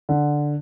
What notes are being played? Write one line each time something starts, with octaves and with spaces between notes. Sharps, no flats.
D3